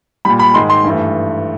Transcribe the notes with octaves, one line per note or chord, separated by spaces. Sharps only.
A#2 G3 B5
B5
G#2 D#3 G#3 C6
C6
G2 E3 A3